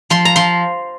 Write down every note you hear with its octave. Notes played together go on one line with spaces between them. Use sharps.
F3 C6
A#5
F3 C6